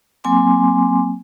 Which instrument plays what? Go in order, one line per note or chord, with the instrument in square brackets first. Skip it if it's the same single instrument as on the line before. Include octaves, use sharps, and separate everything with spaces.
[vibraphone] F#3 A#3 C4 G#5 C6 D6